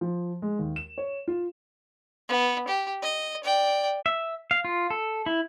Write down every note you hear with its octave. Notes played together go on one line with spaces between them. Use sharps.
F3
G#3
D#2
E7
C#5
F4
B3
G4
D#5
D5 G5
E5
F5
F4
A4
E4